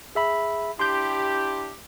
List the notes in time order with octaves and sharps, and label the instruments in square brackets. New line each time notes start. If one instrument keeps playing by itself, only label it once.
[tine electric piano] G#4 E5 B5
[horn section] D4 E4 G4 [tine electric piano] C6 G6